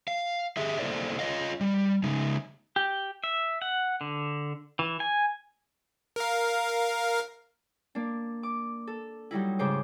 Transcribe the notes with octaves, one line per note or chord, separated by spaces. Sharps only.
F5
G4 G#4 E5
A#3 E4 A4 C5 D5
F4 C#5 D#5 F5
G3
C#3 G#3 D#4
G4
E5
F#5
D3
E3
G#5
A#4 F5
A#3 D4
D6
A4
F#3 G3 D#4 E4
G#2 C#3 C#4 C5 D6